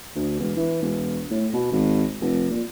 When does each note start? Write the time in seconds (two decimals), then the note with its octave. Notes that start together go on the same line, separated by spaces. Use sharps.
0.15 D2
0.39 E1
0.56 E3
0.82 E1
1.31 A2
1.53 B2
1.71 G#1
2.21 F1
2.51 A#2